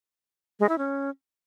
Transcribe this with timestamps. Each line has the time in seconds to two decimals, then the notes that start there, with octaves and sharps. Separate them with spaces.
0.60 G#3
0.69 E4
0.78 C#4